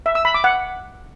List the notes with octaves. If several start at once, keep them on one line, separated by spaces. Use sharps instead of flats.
E5
E6
B5
D6
F#5